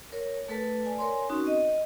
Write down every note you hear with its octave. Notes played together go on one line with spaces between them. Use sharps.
A#4 C#5
A3 A4 B4 A5
D5 G#5
A#4 C#5 G#5 C6
C4 C#4 D#4 F#4
D#5